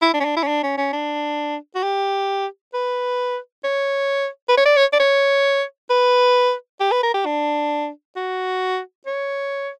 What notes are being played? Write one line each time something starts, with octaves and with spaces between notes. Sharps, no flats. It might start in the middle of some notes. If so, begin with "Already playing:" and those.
E4
D4
C#4
D4
E4
C#4
D4
C#4
C#4
D4
F#4
G4
B4
C#5
B4
C#5
D5
C#5
D5
C#5
B4
G4
B4
A#4
G4
D4
F#4
C#5